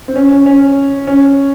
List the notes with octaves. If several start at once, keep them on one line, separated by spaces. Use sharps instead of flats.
C4
C#4
C#4
C#4
C#4